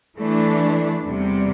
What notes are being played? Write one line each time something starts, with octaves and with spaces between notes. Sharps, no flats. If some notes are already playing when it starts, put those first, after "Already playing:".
E3 A3 D4
E2 C3 G3